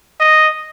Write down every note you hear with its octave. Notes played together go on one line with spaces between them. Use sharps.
D#5